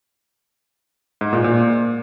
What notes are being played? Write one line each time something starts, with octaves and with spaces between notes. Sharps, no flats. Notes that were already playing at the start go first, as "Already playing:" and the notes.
G#2
A#2
A#2